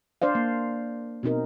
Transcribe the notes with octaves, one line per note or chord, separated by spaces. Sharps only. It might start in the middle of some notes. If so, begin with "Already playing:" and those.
D4 C5 D5 F5
A#3
B2 C4 D#4 A#4